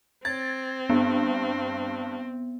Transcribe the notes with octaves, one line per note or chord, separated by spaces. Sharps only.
C4 G#6 A6
G2 B3